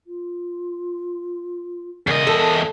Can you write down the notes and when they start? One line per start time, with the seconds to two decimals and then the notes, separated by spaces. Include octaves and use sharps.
0.07 F4
2.07 E2 C#3 A#4 D#5
2.27 A4 A#4